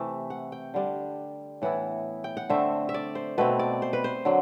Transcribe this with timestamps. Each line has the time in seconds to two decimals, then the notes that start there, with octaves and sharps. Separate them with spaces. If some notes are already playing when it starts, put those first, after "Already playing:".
Already playing: C3 E3 A3
0.30 F#5
0.52 G5
0.74 D3 G3 D4
1.62 A2 E3 B3 E4 F#5
2.24 G5
2.37 F#5
2.50 D3 A3 C4 E5
2.89 E5
2.94 D5
3.15 C5
3.38 B2 A3 C4 B4
3.59 D5
3.82 C5
3.93 B4
4.04 C5
4.25 D3 F#3